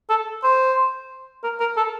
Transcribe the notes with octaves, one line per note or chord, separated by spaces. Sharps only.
A4
C5
A#4
A#4
A4